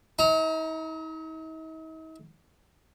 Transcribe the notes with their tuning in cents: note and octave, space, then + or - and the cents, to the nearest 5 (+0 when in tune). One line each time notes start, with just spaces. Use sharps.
D#4 +45 A#5 -5